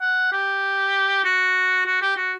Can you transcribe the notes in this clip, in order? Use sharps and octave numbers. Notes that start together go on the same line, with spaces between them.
F#5
G4
F#4
F#4
G4
F#4